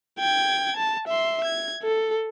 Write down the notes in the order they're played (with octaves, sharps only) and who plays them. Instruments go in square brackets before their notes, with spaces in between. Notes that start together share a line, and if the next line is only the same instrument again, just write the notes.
[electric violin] G5 G#6
A5
E5 C6
G#6
A4